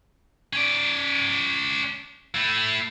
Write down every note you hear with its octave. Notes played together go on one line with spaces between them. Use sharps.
C#4 D5
A3 E4